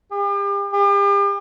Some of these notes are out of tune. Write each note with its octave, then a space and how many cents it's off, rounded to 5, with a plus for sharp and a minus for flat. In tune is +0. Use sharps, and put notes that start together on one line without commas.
G4 +40
G4 +40